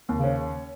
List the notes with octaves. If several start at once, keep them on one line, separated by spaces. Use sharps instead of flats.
D#2
C#3
C#4